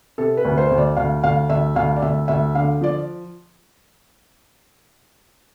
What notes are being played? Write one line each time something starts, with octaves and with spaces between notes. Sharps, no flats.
C3 A4
B4
D2
C5
D2
D5
D2 F5
D2 F5
D2 E5
D2 F5
D5
D2 E5
D2 E5
D3 F5
F3 D5